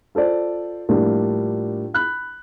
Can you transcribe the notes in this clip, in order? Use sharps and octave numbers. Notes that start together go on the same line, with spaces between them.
F4 A4 C5 D5
A2 F3 G3 A#3 D4 F4
B5 F#6